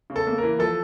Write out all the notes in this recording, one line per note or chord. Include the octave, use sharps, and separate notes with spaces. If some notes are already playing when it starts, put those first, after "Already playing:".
C#3
A4
A#3
E3 A#4
F3 A4